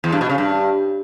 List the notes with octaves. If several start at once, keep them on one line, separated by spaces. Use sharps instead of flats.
E2
G2
B2
C#3
G2